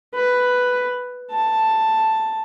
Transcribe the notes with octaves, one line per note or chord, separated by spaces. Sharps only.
B4
A5